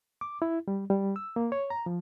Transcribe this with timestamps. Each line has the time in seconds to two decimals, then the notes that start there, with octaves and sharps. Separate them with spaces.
0.21 D6
0.42 E4
0.68 G3
0.90 G3
1.16 E6
1.36 A#3
1.52 C#5
1.70 A#5
1.86 F3